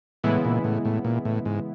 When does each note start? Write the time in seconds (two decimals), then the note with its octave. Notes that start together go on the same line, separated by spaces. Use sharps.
0.24 A2 C#3 E3 G#3 B3 E4
0.45 A#2
0.64 A2
0.85 A2
1.05 A#2
1.25 A2
1.45 G#2